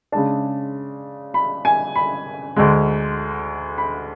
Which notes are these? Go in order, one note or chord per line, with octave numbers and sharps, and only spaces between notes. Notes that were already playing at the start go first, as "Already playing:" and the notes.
C#3 G#3 D4 A5
B5
G#5
B5
D2 D3 G#3
B5